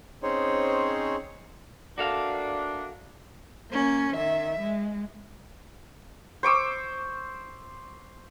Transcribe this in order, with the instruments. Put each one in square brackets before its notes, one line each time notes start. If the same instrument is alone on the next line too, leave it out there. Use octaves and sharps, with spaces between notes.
[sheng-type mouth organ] C4 C#4 D#4 G#4 C5 C#5
[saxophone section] A3 A#3 D4 [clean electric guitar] F#4 A4 F5
[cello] A#3 C#4
D#3 E5
G#3
[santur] C5 C#6 D6 E6